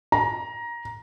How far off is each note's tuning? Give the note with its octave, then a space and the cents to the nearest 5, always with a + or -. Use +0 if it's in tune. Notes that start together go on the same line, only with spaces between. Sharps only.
A#5 +15